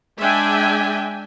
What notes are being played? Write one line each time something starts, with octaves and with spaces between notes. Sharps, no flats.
G#3 D4 E5 G5 G#5